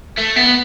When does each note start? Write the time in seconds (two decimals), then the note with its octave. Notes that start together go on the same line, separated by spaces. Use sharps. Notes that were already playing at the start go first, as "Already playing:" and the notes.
0.18 A3
0.36 B3